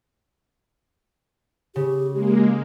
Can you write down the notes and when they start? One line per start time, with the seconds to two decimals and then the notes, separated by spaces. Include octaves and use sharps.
1.76 C#3 G4
2.12 G#3 A#3